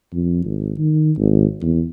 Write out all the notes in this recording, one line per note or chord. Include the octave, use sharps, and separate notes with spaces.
F2
G#1
D#3
G#1
E2